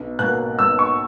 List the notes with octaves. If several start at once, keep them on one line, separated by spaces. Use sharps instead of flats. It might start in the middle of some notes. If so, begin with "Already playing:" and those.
Already playing: B1
B2 A#3 F#6
B1 E6
C#6